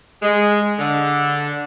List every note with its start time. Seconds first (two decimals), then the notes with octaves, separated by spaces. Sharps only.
0.22 G#3
0.79 D3